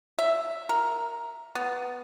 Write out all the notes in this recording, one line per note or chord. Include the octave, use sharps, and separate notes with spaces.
E5
A#4
B3